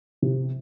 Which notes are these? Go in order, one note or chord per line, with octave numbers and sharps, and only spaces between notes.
C3